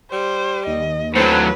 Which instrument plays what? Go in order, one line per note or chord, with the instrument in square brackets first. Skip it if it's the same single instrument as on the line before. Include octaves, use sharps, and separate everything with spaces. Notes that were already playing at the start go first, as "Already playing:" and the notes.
[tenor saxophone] G3 [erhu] C5
[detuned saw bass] D#2 [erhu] D#5
[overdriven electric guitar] A2 F#3 [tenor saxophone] C4 [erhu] B4